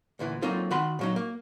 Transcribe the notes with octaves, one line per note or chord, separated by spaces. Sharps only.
D2 A#2 E3
F#3 A#3 C4 D#4 F4 A4
D#3 F#4 B5 C6
A#2 F#3 D#4
A#3